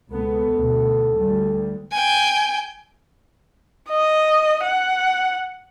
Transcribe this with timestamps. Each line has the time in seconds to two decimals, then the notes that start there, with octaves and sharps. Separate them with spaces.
0.13 C#2 B2 B3 A4
0.56 D2 B2
1.18 D2 G3
1.92 G5 G#5
3.89 D#5
4.64 F#5